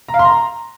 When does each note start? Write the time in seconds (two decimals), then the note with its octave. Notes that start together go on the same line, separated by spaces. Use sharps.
0.08 A#5
0.14 F5
0.19 C6
0.25 A#5